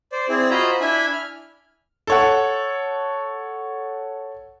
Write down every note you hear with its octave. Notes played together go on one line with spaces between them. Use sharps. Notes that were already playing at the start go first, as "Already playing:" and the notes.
C5 D5
C4 E4 G#4 D5
F4 F#4 C5 D#5 A#5 B5
D4 E4 E5 G#5 B5
F6
A4 C#5 F#5